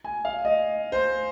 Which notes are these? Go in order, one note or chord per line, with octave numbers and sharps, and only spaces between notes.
G#5
F5
D#5
C5